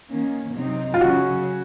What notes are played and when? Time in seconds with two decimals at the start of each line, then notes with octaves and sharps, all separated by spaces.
0.10 D#3 A#3 C#4
0.56 C3 F#3 C4 D#4
0.94 F4
1.00 C#3 F#3 C#4 F#4